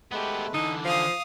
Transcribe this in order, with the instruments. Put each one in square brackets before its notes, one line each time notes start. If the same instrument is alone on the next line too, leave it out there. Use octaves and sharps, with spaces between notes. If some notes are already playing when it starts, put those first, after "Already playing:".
[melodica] G#3 A3 B4 [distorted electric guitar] B3 G4
[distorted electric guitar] D3 E3 [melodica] D4 [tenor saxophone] D#4
[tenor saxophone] F3 [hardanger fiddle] F5 D#6